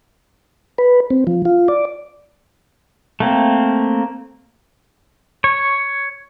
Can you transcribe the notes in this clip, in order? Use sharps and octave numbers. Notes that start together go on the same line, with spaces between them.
B4
C4
F3
F4
D5
A3 A#3 C4
C#5